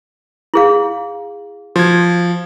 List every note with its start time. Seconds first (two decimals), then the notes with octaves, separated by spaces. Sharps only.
0.54 E4 G#4 F5
1.76 F3 F#4 G#6